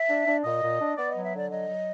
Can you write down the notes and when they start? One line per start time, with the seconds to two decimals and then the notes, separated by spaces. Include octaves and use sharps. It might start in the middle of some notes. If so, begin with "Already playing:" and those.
Already playing: E5
0.08 D4
0.26 D4
0.44 A#2 D#5
0.61 A#2
0.79 D4
0.97 B3 D5
1.10 F#3 D#5
1.24 E5
1.33 D3 D5
1.50 F#3 D#5
1.68 F#3